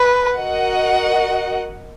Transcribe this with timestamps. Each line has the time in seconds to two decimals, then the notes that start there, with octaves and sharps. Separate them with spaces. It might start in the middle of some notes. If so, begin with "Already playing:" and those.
Already playing: B4
0.36 F#4 A#4 D#5 F#5